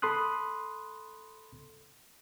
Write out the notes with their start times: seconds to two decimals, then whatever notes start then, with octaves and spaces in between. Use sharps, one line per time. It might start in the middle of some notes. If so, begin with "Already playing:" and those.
0.02 A4 B5 C6 D#6 F#6